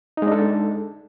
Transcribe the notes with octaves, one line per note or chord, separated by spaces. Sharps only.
G#3 D4 D#4 A4